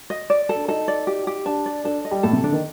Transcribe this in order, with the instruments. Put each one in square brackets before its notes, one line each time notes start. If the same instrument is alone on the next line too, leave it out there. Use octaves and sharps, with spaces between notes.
[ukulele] D#5
D5
A4
[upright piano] D4
[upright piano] D#4 [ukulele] A4
[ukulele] D5
G4
G4
[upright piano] D4 [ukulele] A5
[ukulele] D5
[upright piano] D4 [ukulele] A4
[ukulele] D#5
[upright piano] G3
[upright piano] A2 [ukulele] A4
[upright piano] C3
[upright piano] D3 [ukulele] D4
[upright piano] D#3